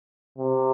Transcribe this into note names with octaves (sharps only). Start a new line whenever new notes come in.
C3